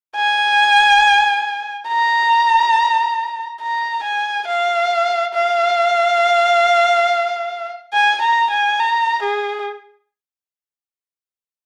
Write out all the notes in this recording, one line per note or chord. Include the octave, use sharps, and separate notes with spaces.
G#5
A#5
A#5
G#5
F5
F5
G#5
A#5
G#5
A#5
G#4